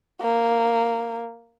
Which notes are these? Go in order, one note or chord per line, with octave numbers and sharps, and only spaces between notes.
A#3